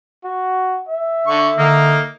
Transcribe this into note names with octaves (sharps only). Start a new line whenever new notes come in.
F#4
E5
D3 D4 C#6
D3 A#3 D#4